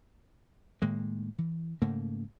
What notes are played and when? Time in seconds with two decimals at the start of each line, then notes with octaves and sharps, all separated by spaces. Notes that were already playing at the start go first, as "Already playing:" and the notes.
0.82 A2 D#3 G#3 A#3
1.38 E3
1.82 G#2 C#3 A3 A#3